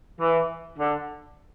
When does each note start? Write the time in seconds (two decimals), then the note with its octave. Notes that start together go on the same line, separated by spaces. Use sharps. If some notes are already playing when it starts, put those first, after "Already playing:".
0.20 E3
0.76 D3